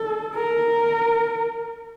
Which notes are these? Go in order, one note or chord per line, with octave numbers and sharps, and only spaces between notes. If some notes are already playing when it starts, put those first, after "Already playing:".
Already playing: A4
A#4